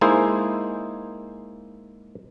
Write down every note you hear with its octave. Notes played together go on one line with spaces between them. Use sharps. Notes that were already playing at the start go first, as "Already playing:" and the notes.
G#3 A#3 D#4 E4 G#4 C5